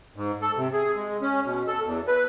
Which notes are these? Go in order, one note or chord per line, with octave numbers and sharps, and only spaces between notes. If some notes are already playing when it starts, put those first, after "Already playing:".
G#2
A4
C3
G#4
G#3
C#4
B2
A4
E2
B4